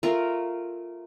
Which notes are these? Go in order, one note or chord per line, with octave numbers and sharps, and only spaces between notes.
A3 F4 A#4